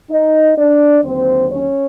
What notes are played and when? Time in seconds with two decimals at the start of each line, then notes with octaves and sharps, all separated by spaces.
0.10 D#4 D#5
0.57 D4 D5
1.04 D#2 D3 F#3 C4 C5
1.50 C#4 C#5